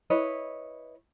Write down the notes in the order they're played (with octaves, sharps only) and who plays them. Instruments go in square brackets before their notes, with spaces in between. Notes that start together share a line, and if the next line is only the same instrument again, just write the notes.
[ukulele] E4 B4 C#5 D#5